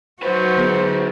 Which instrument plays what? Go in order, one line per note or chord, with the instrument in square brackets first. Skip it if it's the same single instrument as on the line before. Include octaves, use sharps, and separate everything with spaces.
[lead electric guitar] D#3 B4 [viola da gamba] F#3 F#4 [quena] C5
[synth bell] D3 B3 G#4